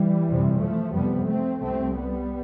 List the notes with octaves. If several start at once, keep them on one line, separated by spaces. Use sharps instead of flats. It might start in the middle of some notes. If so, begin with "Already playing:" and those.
Already playing: E3 G3
F2 C3
F3 A3
F2 C3 G3 B3
A3 C4
C2 C3 A3 C4
G3 B3